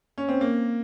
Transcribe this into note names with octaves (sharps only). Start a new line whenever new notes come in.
C#4
C4
A#3